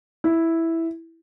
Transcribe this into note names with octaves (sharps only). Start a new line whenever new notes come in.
E4